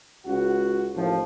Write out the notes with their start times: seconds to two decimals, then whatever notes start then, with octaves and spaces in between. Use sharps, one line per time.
0.25 C#2 F#4
0.95 A1 D#2 F3